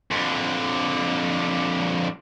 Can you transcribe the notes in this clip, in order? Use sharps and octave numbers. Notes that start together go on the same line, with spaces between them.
F2 D3